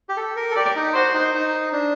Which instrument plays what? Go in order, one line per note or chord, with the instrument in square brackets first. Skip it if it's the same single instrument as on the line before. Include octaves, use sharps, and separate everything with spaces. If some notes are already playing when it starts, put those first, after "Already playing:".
[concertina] G4
A4
A#4
A4
[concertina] G4 [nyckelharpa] D5
[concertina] D#4
[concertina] F#4 [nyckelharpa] C5
[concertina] D#4
D#4
D4